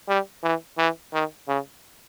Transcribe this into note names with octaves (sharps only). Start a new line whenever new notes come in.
G3
E3
E3
D#3
C#3